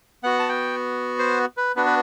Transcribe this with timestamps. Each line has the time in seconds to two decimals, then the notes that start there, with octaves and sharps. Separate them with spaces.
0.23 B3 F#4 F#5
0.39 A5
0.49 G5
1.19 C5
1.57 B4
1.76 B3 D4 F#4 B4
1.86 B4